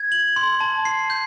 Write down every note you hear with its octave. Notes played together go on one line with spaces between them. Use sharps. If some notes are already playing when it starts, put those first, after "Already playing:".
Already playing: G#6
F#7
C6
A5
C7
G6